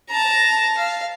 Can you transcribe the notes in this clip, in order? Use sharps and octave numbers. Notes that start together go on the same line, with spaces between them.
A5 A#5
F5